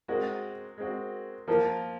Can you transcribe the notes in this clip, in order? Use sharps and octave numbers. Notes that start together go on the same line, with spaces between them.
G#3 C4 F#4 A#4
G#3 C4 F#4
F3 A#3 F4 A#4